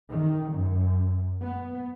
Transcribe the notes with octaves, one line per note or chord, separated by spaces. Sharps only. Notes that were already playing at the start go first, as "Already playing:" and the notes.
D#3
F#2
B3